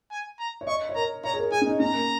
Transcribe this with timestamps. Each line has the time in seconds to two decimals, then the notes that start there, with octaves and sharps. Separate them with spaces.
0.11 G#5
0.39 A#5
0.61 C#5
0.67 D#5 C#6
0.89 C#5
0.95 A#4 A#5
1.24 C#5 A#5
1.33 G#4
1.38 A#4
1.52 G#4 G#5
1.61 C#4
1.66 D#4
1.80 C#4 A#5
1.94 A#3